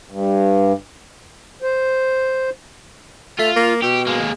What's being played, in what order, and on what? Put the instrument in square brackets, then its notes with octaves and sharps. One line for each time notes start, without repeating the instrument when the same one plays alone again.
[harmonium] G2
C5
[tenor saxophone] A3 [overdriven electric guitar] F4
[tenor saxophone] A#3
[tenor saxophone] B2 [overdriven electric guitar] G4
[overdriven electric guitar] G#3 A#3